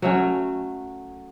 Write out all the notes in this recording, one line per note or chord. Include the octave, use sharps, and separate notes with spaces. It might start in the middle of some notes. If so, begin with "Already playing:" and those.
F#3 A3 C#4